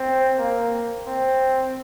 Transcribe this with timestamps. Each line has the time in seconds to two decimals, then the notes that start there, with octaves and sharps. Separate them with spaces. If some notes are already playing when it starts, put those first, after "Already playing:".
Already playing: C4
0.39 A#3
1.07 C4